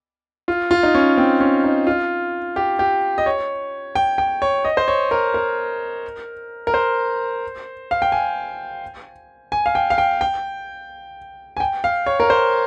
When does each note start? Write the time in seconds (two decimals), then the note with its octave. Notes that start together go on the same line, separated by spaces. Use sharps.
0.48 F4
0.71 F4
0.83 D#4
0.94 C#4
1.18 C4
1.40 C#4
1.64 D#4
1.87 F4
2.56 G4
2.79 G4
3.18 D#5
3.26 C#5
3.95 G5
4.18 G5
4.42 C#5
4.65 D#5
4.77 C5
4.88 C#5
5.11 A#4
5.34 A#4
6.67 A#4
6.74 C5
7.91 F5
8.02 G5
8.12 G#5
9.52 G#5
9.66 F5
9.75 G5
9.90 F5
9.98 G5
10.21 G5
11.57 G#5
11.60 G5
11.84 F5
12.06 C#5
12.20 A#4
12.30 C5